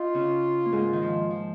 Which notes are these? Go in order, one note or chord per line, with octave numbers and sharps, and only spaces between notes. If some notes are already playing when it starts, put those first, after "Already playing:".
Already playing: D#4 F4
C#3 C#4
A#3
G#2 G#3
D#3
F3
F3